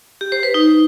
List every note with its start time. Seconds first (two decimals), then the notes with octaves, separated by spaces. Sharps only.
0.21 G4
0.32 C5
0.43 B4
0.54 D#4